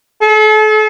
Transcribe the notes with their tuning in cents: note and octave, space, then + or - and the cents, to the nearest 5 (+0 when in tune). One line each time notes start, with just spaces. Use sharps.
A4 -40